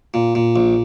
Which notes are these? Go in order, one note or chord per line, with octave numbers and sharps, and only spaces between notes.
A#2
A#2
A#1